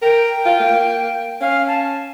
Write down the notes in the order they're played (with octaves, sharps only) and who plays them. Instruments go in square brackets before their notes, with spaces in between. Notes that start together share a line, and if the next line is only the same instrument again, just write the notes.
[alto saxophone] A#4 [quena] G5
[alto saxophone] F4
A#3
[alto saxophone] C#4 [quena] F5
[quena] A5